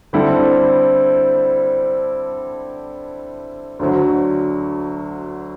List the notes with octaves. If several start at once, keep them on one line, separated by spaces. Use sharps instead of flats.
D3 G3 C4 E4 A4
D2 D3 F#3